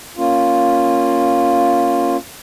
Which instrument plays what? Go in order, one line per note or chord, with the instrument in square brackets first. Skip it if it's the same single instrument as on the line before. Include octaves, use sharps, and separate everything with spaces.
[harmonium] A#3 C#4 F4